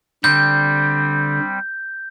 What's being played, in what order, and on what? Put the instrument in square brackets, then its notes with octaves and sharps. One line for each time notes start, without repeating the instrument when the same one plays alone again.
[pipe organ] D3 [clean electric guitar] G3 C4 [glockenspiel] G6